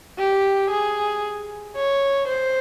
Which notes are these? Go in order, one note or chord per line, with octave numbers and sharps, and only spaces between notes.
G4
G#4
C#5
C5